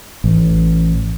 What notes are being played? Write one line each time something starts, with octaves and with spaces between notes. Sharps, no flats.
A1